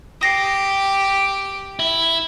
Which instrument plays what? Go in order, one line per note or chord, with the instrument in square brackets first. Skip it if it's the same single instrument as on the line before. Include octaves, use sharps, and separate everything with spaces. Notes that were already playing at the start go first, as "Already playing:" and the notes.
[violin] G4 [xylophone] D#6 A#6 C7
[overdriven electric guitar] E4